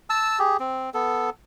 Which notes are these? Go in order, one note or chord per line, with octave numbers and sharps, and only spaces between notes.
A5 E6
G4 G#4
C4
B3 A4